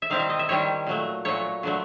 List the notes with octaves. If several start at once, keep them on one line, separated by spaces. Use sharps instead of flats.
E5
D#3 G3 C4 E4 F5
E5
D#5
E5
D#3 G3 C4 E4 C#5
A#2 F#3 A3
A#2 F#3 A3 C#5
D3 F#3 A3